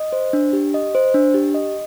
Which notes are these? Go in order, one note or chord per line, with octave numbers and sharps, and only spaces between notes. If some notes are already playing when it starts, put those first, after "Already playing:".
Already playing: D#5
C5
D4
G4
D#5
C5
D4
G4
D#5